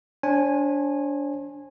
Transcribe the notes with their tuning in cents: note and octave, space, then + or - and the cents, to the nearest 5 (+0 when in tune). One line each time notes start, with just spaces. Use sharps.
D4 -25 C5 +40 G#5 -10